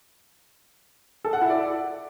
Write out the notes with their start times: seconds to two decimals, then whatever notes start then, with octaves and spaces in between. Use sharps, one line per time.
1.25 A4
1.33 F#5
1.41 E4
1.50 D5